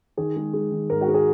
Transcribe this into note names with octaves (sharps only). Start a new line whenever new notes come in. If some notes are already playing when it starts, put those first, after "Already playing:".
D#3 G#4
G#3
G#3
D#3
G#2 A#4
F#4
G#3 A#4
G#4